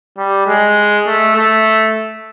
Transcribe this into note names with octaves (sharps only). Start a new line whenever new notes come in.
G3
G#3
A3
A3